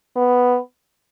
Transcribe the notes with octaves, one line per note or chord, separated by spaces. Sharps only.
B3